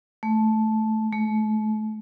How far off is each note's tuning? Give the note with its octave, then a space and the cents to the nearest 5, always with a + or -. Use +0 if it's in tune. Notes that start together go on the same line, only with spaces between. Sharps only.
A3 -10
A3 -35